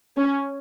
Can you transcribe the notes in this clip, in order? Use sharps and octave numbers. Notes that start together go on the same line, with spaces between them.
C#4